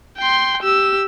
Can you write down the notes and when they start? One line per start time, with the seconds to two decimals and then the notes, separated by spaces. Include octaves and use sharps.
0.18 G5 C6
0.62 G4 E6